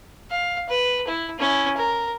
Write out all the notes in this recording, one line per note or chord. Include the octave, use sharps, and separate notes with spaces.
F5
B4
E4
C#4 E4
A#4